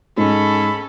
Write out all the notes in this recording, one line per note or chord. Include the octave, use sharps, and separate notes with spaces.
G#2 C#4 A4 B5